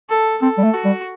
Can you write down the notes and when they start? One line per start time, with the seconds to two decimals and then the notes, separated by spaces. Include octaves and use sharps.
0.09 A4
0.42 C4 A4
0.58 G3
0.64 A3
0.74 F#4
0.85 G3